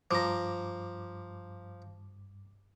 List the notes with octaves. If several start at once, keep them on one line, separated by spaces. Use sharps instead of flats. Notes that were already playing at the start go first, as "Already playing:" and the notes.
G2 F3 A#5 D6